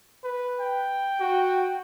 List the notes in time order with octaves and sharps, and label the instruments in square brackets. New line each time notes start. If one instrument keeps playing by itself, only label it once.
[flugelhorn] B4
[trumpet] G5
[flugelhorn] F#4